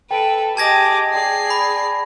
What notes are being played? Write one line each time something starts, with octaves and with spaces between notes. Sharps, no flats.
A4 B4 G5 D7
G4 G#4 D#5 A5 D6 G#6 A#6
G#4 D5 G5 C7
B5